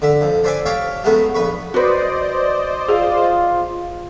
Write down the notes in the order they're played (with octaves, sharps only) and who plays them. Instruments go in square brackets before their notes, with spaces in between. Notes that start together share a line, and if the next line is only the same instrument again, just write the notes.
[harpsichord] D3 E5
F2
D4 C5 E5 G#5 D6
G4 C#5 E5 F5 G5 A5
F#3 G#3 A3 B3 C#4
A#1 B4 B5 C#6
[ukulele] F#4 B4 [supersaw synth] C5 D5 D#5
[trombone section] F4 [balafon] G#4